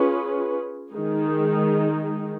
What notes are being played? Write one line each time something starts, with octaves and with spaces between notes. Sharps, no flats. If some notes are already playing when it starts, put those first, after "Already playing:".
Already playing: C#4 F4 G#4 B4
D#3 G#3 D#4 G#4